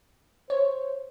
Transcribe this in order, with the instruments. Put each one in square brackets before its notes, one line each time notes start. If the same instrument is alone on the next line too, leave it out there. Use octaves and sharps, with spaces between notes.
[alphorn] C5 [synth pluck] C#5